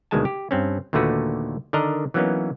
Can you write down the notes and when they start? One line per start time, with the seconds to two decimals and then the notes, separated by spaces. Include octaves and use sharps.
0.11 D2 B2 D#3 G#3 G#5 A5
0.25 G4
0.51 G2 C4 C#4
0.93 D#2 A#2 D3 A3 F#4 B4
1.73 D3 D#3 D4 A#4 D#5 A#5
2.14 E3 F#3 A#3 B3 C#4 D#4